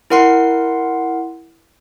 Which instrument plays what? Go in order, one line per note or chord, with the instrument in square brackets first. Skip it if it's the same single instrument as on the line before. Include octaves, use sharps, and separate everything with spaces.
[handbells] E4 A#4 F#5 C6 C7